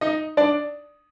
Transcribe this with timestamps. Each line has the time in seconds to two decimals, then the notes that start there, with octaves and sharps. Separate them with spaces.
0.01 D#4 D#5
0.37 D4 D5